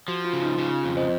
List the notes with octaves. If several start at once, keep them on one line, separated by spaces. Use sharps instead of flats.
F3 F#4
F4
C#3
D#4
C#3 F4
F4
F2 F4
C5 D#5